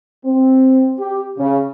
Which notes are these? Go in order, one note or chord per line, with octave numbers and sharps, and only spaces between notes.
C4
G4
C#3